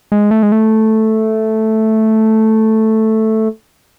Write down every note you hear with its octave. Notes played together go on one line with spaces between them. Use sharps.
G#3
A3
G#3
A3